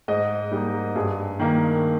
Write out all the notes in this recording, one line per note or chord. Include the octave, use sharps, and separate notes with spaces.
G#2 D#5
G3 A#3 D#4
G2 G#4
D#3 A#3